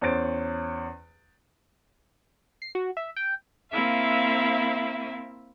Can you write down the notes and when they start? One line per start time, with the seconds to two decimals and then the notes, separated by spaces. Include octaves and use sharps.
0.01 E2 C#4 C5 A6 D7
2.62 C7
2.75 F#4
2.97 E5
3.16 G5
3.71 A#3 C4 E4 E5 F5